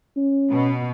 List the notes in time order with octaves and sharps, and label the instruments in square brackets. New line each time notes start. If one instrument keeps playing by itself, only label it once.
[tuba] C#4
[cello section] B2